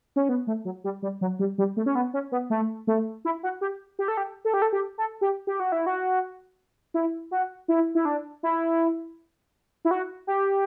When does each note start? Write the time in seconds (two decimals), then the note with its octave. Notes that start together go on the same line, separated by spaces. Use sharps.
0.16 C#4
0.29 B3
0.47 A3
0.65 F#3
0.84 G3
1.02 G3
1.21 F#3
1.39 G3
1.58 G3
1.77 A3
1.86 C#4
1.95 B3
2.14 C#4
2.32 B3
2.50 A3
2.87 A3
3.25 E4
3.43 F#4
3.61 G4
3.99 G4
4.08 A4
4.17 G4
4.45 A4
4.54 G4
4.62 A4
4.73 G4
4.98 A4
5.21 G4
5.47 G4
5.60 F#4
5.72 E4
5.86 F#4
6.94 E4
7.31 F#4
7.68 E4
7.95 E4
8.05 D4
8.43 E4
9.85 E4
9.91 F#4
10.27 G4